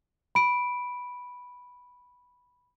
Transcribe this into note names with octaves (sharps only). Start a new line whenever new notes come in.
B5 D7